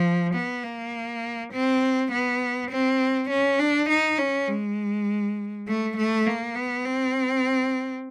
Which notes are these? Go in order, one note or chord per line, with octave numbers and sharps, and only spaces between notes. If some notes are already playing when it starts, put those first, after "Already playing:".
Already playing: F3
B3
A#3
C4
B3
C4
C#4
D4
D#4
C#4
G#3
A3
A3
A#3
B3
C4